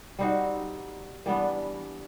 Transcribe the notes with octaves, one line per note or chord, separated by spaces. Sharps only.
G3 C4 D#4 F#4
E3 G3 B3 D4